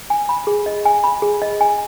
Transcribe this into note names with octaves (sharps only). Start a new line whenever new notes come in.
G#5
B5
G#4
D#5
G#5
B5
G#4
D#5
G#5